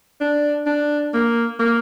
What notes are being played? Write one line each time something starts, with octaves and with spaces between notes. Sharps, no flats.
D4
D4
A#3
A#3